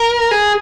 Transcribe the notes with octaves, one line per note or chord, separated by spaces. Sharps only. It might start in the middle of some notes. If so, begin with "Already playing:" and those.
Already playing: A#4
G#4